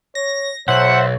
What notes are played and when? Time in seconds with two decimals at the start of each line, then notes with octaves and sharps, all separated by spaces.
0.15 C#5 A#6
0.68 B1 C5 C#5 E5 F#5